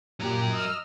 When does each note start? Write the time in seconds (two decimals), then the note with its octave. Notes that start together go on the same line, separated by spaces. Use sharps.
0.20 A#2 F#3 G4 A#4
0.50 D#5 E6 F6